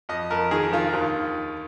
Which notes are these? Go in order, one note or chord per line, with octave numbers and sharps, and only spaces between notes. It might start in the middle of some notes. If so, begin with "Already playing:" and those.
F2 D#5
F2 A#4
D#3 G#4
D#3 F4
D#2 F4